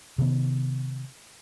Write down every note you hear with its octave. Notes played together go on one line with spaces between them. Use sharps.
C3 D#3 B3